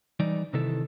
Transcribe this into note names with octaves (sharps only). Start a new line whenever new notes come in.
E3 G3 D#4 D5
C3 D#3 E3 E4 A4